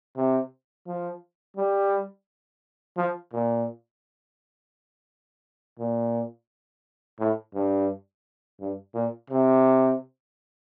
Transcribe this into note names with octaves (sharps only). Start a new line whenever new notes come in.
C3
F3
G3
F3
A#2
A#2
A2
G2
G2
A#2
C3